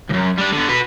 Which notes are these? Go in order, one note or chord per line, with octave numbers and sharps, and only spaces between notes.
C#2 F#2
G3 D4
D3 B3
F#4 B4